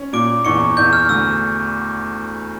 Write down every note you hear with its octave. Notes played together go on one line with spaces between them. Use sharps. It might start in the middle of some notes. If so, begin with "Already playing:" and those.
Already playing: C#4
A#2 D6 D7
E2 C#6 C#7
E2 G6
F6
D2 E6